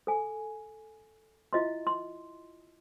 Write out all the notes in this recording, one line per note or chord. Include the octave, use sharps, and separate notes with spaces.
A4 G#5
E4 F4 D#5 E5 C6
C6